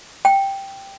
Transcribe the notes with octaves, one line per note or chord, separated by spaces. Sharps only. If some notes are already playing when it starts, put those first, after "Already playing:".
G5